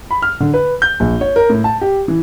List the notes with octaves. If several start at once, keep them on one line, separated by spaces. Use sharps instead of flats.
B5
F6
D3
B4
G6
A#1
C#5
A#4
A2
A5
G4
E3